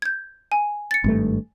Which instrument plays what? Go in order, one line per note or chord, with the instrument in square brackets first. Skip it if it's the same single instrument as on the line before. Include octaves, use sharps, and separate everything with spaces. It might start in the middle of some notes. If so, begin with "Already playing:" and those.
[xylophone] G6 G#6
G#5
A6 C#7
[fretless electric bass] G#1 G2 A3